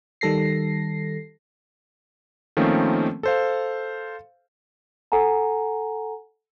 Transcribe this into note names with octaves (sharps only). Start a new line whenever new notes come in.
D#3 G3 A4 A#6 C7
D#3 F3 A3 A#3 C4 C#4
A4 C5 F5
A4 F#5 G#5 A#5